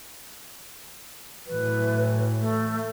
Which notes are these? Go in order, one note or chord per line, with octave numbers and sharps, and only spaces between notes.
A2 E3 F#3 B4
A3